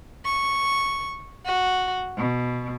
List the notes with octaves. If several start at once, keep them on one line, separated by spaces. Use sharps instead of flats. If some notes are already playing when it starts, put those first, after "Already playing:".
C#6
F#4
B2